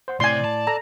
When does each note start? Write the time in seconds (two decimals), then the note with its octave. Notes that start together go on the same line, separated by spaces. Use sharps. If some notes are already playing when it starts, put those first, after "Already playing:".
0.08 C5 F#5 C6
0.20 A2 C3 C5 D5 G#5 C6
0.45 A5
0.67 A4 A#5